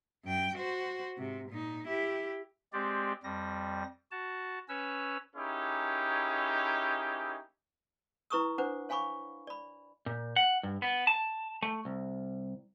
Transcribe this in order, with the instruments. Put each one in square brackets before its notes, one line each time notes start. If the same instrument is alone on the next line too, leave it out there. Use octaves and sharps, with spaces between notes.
[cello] F#2 G5
F#4 C5
G#2 C3
A#2 D#4
E4 G4
[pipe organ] G#3 C4 G4 D5
F2 G3 A#6
F#4 A5
C#4 B4 C#5 E6
[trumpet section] A#3 C#4 D#4 E4 G4 G#4
[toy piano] E4 B4 A#5 C#6 D#6 E6
D4 B4 C5 F#5 D6
C#5 F5 G#5 B5 C#6 D6
D5 B5
[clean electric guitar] A#2
F#5
G2
B3
A5
A3
C2